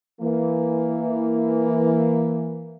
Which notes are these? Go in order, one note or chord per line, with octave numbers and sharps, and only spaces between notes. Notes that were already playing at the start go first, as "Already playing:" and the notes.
E3 A#3